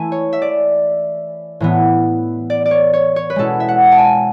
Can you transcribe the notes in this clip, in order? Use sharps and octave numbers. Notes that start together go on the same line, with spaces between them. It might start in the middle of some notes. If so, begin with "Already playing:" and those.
Already playing: E3 A3 E4 G#5
C#5
E5
D5
A2 E3 B3
D5
D5
C#5
C#5
C#5
B4
B2 G#3 C#4 E4 A4
E5
F#5
A5
G#5